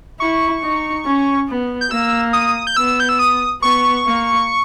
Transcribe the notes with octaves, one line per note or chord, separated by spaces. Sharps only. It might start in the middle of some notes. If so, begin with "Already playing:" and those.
E4 C#6
D#4
C#4
B3
G6
A#3 E6
D#6
G6
B3 E6
G6
E6
D#6
B3 C#6
A#3